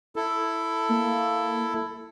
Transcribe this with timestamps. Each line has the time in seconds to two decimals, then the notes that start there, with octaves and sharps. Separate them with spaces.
0.16 E4 A4
0.89 A#3